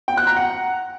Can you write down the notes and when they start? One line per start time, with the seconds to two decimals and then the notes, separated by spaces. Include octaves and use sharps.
0.08 G5
0.17 F#6
0.27 A#5
0.37 F#5